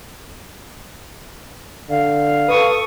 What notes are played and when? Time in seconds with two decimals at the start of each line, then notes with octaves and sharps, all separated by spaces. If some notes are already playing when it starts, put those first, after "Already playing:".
1.89 D3 F5
2.48 A4 B4 C#6 D#6